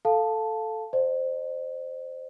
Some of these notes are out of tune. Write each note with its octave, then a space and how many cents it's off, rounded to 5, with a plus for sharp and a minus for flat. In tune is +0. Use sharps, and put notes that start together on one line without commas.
A4 +0 F5 +5 A5 +0
C5 +0 D#5 -45